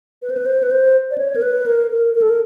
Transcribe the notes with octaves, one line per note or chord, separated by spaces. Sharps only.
B4
C5
B4
C5
B4
C5
D5
C#5
A#4
B4
A#4
A#4
A#4
A4
A#4